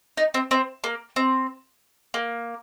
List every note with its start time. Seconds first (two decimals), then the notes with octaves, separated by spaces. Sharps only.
0.17 D#4
0.34 C4
0.51 C4
0.84 A#3
1.16 C4
2.14 A#3